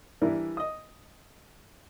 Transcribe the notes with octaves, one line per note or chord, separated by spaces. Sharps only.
E3 G3 D4 E4 A#4
D#5 D#6